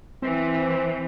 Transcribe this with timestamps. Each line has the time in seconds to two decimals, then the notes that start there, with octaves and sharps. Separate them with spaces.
0.22 E3 C4